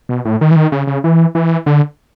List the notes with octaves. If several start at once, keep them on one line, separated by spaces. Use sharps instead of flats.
B2
A2
D#3
E3
D#3
C#3
C#3
E3
E3
D3